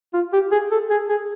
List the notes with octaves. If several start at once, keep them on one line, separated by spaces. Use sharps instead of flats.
F4
G4
G#4
A4
G#4
G#4